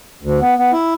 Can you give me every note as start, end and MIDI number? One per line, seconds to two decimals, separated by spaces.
0.22 0.40 38
0.42 0.54 59
0.58 0.71 59
0.73 0.94 64